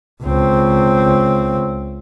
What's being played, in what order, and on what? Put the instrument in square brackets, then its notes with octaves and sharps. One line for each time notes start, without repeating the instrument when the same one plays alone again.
[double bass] C#2 C4